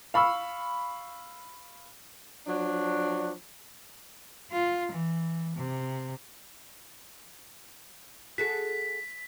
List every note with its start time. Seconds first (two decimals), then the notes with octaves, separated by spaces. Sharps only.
0.14 F5 B5 C#6 E6
2.47 F3 F#3 D4
4.51 F4
4.92 E3
5.56 C3
8.38 F#4 G#4 A4 B6